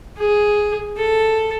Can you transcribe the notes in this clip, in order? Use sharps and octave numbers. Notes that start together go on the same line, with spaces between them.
G#4
A4